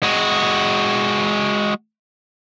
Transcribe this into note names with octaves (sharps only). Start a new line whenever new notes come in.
G#3 F#4